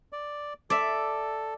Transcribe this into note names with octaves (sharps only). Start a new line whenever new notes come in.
D5
A4 D5 E5